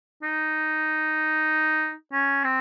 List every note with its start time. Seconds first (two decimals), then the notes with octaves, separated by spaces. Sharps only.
0.23 D#4
2.12 C#4
2.44 C4